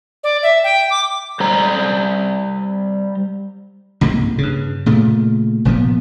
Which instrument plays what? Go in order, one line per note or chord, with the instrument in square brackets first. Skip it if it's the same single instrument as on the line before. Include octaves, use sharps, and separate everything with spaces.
[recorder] D5
E5
G5
D6
[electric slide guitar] G3 C5 A#5
[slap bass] C#2 G#2 C3 A#3
G2 C#3
A#2 C#3 A3
F1 A#2 F3 B3